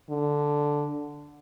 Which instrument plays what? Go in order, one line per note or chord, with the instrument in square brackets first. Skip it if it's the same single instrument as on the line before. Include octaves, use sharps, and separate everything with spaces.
[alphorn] D3